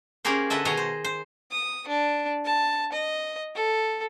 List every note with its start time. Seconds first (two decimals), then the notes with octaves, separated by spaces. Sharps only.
0.25 A#3 C#4 G4 G#4 A#4 C5
0.50 D3 B4 D#5 E5 A5
0.65 B2 D#3 G#4 C#5 D#5 A#5
0.77 C5
1.04 C5
1.52 D#6
1.88 D4
2.45 A5
2.92 D#5
3.55 A4